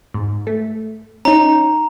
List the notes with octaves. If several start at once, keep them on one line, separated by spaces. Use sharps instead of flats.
G#2
A3
C#4 D#4 A#5